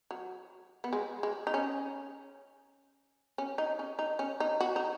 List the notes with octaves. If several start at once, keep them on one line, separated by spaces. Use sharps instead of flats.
F#3
B3
G#3
G#3
D#4
C#4
C#4
D#4
C#4
D#4
C#4
D#4
F#4
D#4